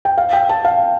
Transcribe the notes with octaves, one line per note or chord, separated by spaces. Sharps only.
G5
F5
G5
A5
F5